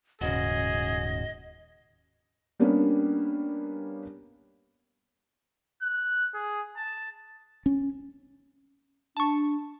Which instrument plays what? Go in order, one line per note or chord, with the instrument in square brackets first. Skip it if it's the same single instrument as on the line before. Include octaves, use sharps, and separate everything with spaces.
[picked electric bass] D#1 C#3 [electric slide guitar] G#2 F#4 [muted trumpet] G#4 [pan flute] D#5
[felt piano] G3 A#3 B3 C#4 D4
[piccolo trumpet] F#6
G#4
A5
[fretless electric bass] C#4
[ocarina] D4 [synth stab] A5 C#6